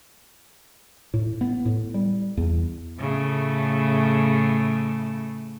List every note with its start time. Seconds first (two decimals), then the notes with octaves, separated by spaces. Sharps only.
1.14 A2
1.41 B3
1.65 A2
1.94 G3
2.37 E2
2.98 A2 C#3 A3